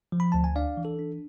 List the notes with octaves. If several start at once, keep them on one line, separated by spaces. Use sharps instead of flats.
F3
B5
D2 A5
G#5
D4 D5 F5
E3
A4
D4